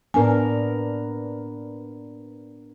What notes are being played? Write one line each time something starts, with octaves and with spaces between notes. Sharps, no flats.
A2 B3 D4 A#4 G#5